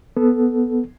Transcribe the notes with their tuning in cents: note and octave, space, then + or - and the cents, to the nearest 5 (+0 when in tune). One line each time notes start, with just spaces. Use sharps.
B3 +0 A4 -10